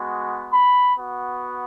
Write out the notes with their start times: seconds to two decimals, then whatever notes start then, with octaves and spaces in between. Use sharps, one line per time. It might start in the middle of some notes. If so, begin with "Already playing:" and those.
Already playing: G#3 B3 F#4
0.53 B5
0.99 B3 F#4